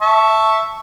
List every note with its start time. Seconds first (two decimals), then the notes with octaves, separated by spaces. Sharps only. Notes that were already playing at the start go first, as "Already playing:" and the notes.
0.02 E5 A5 C#6